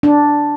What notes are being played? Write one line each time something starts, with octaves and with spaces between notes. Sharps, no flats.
D4